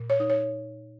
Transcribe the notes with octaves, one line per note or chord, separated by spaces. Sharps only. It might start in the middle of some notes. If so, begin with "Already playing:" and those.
Already playing: A#2
C#5
D#4
C#5